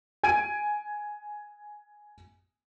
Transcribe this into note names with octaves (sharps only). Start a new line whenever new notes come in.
G#5 G#6 D7 D#7